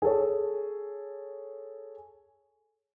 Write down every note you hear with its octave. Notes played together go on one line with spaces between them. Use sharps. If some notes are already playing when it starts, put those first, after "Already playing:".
G#4 A4 C#5